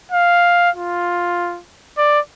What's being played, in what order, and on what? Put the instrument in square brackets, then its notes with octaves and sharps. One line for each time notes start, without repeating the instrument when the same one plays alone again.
[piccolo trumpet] F5
F4
D5